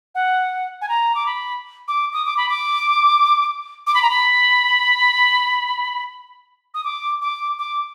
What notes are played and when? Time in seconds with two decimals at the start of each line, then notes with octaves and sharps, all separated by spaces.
0.15 F#5
0.81 G#5
0.89 A#5
1.15 D6
1.26 B5
1.88 D6
2.13 D#6
2.25 D6
2.37 B5
2.49 D6
3.87 D6
3.94 B5
4.02 A#5
4.10 B5
6.74 D#6
6.84 D6
7.21 D6
7.59 D6